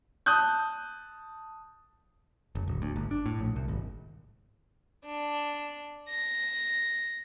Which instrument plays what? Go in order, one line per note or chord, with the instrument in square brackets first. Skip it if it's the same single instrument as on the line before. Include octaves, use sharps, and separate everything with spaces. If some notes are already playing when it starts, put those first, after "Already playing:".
[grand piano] A5 D#6 F#6 G6
[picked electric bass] F#1
D1
D2
G1
D4
A2
A#1
C2
G#1
[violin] D4
A#6